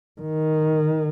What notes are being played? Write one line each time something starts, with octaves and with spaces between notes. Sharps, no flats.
D#3